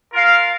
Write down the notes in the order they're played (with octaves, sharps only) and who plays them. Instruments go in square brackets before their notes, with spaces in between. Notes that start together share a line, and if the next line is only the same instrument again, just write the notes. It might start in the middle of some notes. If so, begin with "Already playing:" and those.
[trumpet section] F4 A#4 F5